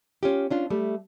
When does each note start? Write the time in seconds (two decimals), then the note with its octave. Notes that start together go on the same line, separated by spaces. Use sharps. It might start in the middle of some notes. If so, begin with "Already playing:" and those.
0.23 C#4 F4 G4
0.50 C#4 D4 F4
0.70 G3 A3